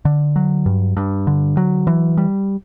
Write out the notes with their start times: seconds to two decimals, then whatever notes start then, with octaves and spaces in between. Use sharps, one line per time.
0.05 D3
0.36 F#3
0.66 G2
0.97 G2
1.27 D3
1.57 F#3
1.87 E3
2.17 G3